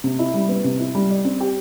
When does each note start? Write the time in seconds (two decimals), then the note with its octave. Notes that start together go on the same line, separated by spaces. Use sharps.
0.04 C3
0.19 E4
0.34 G3
0.49 B3
0.64 C3
0.79 E4
0.95 G3
1.10 D5
1.24 C4
1.41 G4